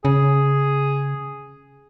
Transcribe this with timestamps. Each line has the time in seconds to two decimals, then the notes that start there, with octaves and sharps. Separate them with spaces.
0.05 C#3 G#4